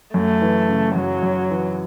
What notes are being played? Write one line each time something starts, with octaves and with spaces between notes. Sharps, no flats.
F#2 A3
E3
C#3
F#2 F#3
F#2
E3